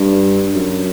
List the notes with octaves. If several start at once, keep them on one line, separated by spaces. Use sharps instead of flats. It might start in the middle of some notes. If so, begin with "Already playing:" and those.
Already playing: G2
F#2